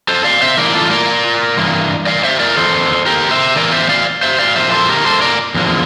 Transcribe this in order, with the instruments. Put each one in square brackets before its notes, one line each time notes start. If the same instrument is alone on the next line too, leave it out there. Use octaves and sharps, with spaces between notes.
[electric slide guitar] A4 C5
D5 F5
C5 E5
A2 E3 G3 A#3 A#4 D5
G4
F4 A4
A#4 D5
G2 E3 A#3
D5 F5
C5 E5
A#4 D5
F2 E3 A#3 A4 C5
G4 A#4
C5 E5
E2 E3 A#3 A#4 D5
C5 E5
D5 F5
C5 E5
D5 F5
A#2 F3 A#3 C5 E5
A4 C5
G4 A#4
A4 C5
A#4 D5
E2 D3 F3 A#3